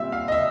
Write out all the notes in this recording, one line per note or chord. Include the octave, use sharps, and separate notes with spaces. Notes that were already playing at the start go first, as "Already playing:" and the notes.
Already playing: A#2 G3 C4 E5
F5
D#5
E5